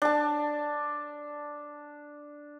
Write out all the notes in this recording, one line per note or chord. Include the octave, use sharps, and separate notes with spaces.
D4 A5